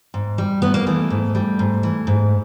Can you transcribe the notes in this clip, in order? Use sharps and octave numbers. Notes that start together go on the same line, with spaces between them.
G#2
G3
G#2 B3
A#3
E3 A3
G#2
G3
G#2
E3
G#2